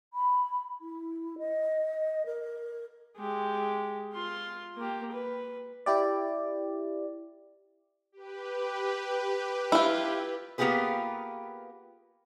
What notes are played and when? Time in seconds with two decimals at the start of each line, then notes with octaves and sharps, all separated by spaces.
0.13 B5
0.81 E4
1.38 D#5
2.26 A#4
3.17 G#3 G4
4.13 F4 C6
4.76 A#3 G4
5.12 B4
5.86 E4 G4 D5
8.12 G4 B4
9.72 E4 F4
10.58 A#3 B3 F4 G4 G#4 B4